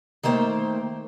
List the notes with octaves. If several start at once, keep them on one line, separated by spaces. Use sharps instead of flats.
D#3 A3 A#3 C5 G5